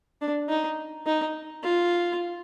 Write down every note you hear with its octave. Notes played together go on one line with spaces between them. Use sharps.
D4
D#4
D#4
F4